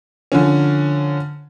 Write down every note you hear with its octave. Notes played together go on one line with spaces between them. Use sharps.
D3 F3 C#4